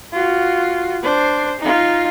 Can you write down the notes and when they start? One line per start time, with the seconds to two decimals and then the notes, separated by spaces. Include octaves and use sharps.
0.13 F4 F#4
1.03 D4 C5
1.60 D#4 F4